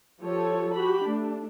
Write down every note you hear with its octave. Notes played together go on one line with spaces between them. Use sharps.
F3 F4 G4 A4 C#5
F#4 G4 B5
A3 D4